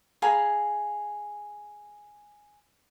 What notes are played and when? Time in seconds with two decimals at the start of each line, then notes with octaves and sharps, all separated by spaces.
0.22 G#4 F5 A#5 B5